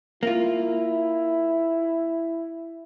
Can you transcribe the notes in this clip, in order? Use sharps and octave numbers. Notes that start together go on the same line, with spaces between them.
A#3 E4 F4